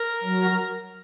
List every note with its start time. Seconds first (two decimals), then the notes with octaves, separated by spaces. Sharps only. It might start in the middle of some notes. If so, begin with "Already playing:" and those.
Already playing: A#4
0.24 F#3